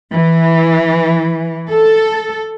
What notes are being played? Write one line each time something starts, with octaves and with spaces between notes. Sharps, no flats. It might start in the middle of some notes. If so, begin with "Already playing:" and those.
E3
A4